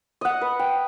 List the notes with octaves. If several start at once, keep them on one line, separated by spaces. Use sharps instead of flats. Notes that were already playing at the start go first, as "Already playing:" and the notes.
D#5 F#5
B4
G5